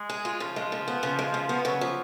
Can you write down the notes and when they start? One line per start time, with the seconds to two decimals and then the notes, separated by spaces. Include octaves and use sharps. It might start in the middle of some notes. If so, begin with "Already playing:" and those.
Already playing: G#3
0.10 G#4
0.25 F4
0.40 C#3 F3
0.56 G#3
0.72 C#3
0.88 B3
1.03 C#3
1.19 G#3
1.34 C#3
1.49 B3
1.65 C#3 F#3
1.81 F3